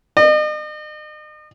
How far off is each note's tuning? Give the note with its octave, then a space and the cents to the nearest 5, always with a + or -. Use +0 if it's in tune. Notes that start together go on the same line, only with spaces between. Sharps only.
D#5 -40